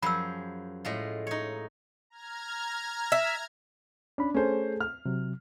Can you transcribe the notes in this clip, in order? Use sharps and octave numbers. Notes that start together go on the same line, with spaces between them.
F#2 F3 G#4 B5 E6
A2 G#3 F4
D#4 C#5
A#5 F6 G#6
E5
C#4 D4 B5
A3 C#4 G#4 A4 C5
F6
C3 F#3